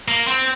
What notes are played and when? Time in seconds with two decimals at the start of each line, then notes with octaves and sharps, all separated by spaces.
0.08 A#3
0.28 C4